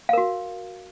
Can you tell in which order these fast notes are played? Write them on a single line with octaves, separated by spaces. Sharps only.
F5 A#4 F#4